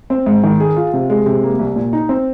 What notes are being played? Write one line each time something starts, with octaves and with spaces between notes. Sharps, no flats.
C4
G#2
D#3
G#4
F4
C3
G#3
C3
A#3
C2
A#2
D#4
C4